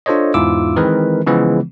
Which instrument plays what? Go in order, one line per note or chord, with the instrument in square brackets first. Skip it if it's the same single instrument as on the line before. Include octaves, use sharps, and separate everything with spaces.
[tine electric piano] D4 F4 A4 C5 C#5 D#5
E2 G#2 E4 F4 D6 E6
D#3 E3 G#3 C4 A#4 B4
C#3 E3 F3 G#3 B3